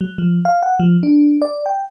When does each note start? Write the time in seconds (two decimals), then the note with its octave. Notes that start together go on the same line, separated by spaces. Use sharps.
0.01 F#3
0.18 F3
0.45 F5
0.63 F#5
0.80 F3
1.03 D4
1.42 D5
1.66 G5